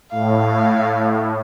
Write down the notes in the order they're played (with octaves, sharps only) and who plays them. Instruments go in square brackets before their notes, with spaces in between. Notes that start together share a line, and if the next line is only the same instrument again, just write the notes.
[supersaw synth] A2 [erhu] F5